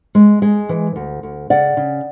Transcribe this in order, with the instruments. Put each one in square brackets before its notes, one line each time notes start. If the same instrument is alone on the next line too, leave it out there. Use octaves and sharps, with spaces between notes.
[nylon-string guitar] G#3
G#3
E3
D2
D2
C#3 D5 F#5
C#3